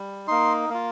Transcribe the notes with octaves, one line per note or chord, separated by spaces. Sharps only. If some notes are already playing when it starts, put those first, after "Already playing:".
Already playing: G3
A#3 D#4 C6
A#3 F4